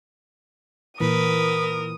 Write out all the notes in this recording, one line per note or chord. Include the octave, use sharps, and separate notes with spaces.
A#2 E3 A#4 B4 D#6